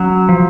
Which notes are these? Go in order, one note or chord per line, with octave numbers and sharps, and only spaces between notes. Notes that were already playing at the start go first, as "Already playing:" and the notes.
Already playing: F#3 C#4
F3